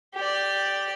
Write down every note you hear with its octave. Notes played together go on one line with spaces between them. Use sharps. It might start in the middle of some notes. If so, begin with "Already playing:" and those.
G4 D5